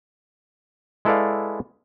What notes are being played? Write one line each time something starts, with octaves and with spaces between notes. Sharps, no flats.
G#3 E4 A4 B4 D5 F5